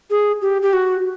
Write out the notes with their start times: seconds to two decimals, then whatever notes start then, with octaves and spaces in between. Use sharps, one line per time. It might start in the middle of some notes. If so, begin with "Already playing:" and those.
0.10 G#4
0.42 G4
0.62 G4
0.73 F#4